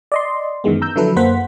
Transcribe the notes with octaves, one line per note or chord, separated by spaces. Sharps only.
D5 D#5 C6
F#2 D#3 E3 G#3 B3
A#5 E6 G6
D3 F3 F#3 E4 A4 B4
F#2 A#3 C5 F#5 B6